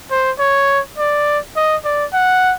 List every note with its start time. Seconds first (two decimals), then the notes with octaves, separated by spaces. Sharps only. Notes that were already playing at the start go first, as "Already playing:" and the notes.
0.11 C5
0.39 C#5
0.98 D5
1.56 D#5
1.85 D5
2.13 F#5